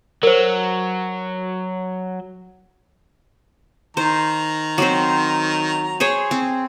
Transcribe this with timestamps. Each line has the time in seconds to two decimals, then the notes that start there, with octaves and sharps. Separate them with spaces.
0.23 F#3 A#4 C5
3.97 D#3 C5 A#5
4.78 F#3 C4 C5
6.00 G#4 C5 C#5
6.31 C4